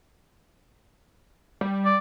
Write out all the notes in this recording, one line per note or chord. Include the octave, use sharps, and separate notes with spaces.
G3
D5